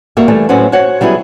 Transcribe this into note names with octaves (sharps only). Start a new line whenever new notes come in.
G3 A#3 F#4 E5
E3 G3 A3
A2 F#3 C4 C#4 B4 F#5
F#4 C5 C#5 F#5
F#3 G3 B3 E4 G#4